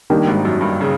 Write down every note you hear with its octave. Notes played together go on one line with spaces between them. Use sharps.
D#3 G3 A#3 D4
G#1 G#2
F#2
G2
C#3